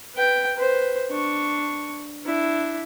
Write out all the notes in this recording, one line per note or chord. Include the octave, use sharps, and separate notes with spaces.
B4 G5
B4 C5
D4 C#6
D4 E4